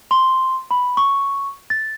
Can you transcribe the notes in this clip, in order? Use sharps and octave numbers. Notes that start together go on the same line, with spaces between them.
C6
B5
C#6
A6